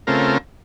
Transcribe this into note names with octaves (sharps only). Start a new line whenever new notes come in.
C#3 A3 C4 F4 A#4